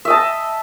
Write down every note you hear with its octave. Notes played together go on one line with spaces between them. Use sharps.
D#5 E5 A5